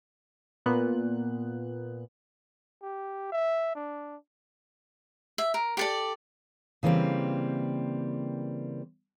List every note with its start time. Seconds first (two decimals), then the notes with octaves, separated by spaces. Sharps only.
0.66 A#2 B3 F#6
2.82 G4
3.32 E5
3.75 D4
5.38 E5
5.54 A#4
5.77 G4 A4 D5
6.83 C#3 E3 G3 A#3 C4